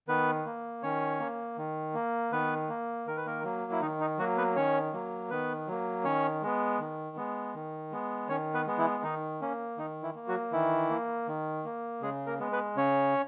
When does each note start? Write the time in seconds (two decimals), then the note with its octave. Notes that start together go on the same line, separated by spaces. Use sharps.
0.08 D#3 B3 B4
0.46 A#3
0.83 D#3 C#4 C#5
1.20 A#3
1.58 D#3
1.94 A#3
2.32 D#3 B3 B4
2.69 A#3
3.07 D#3 A#4
3.17 B4
3.26 A#3 A#4
3.44 F#3 A#3
3.72 E4
3.81 D#3 D#4
4.01 D#4
4.18 F#3 A#3 F#4
4.37 B3 B4
4.56 D#3 C#4 C#5
4.93 F#3 A#3
5.30 D#3 B3 B4
5.67 F#3 A#3
6.05 D#3 C#4 C#5
6.43 G#3 B3
6.80 D#3
7.17 G#3 B3
7.55 D#3
7.92 G#3 B3
8.28 D#3 C#4 C#5
8.54 B3 B4
8.67 G#3 B3
8.78 E3 E4
9.03 D#3 D#4
9.41 A#3 C#4
9.78 D#3 D#4
10.02 E3 E4
10.15 A#3
10.28 F#3 F#4
10.52 D#3 E3 E4
10.90 A#3
11.28 D#3
11.65 A#3
12.01 C#3 G#3 G#4
12.27 A#3 A#4
12.40 G#3 B3
12.52 B3 B4
12.76 C#3 C#4 C#5